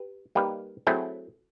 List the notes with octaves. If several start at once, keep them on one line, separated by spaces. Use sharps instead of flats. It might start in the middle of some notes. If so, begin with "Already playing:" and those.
Already playing: G4 B4
G3 A#3 D#4 G4 B4
F#3 A3 C4 E4 G#4